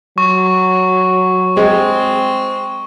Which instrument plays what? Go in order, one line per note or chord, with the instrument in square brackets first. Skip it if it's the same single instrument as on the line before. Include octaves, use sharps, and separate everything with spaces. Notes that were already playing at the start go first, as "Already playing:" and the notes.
[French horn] F#3 [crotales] C#6
[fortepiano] G#3 [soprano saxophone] C4